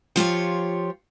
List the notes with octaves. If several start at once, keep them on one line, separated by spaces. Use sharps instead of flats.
F3 F4 G4 C#5